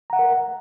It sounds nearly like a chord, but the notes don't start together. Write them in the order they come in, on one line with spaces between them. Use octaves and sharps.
A#5 F#5 E5 A#4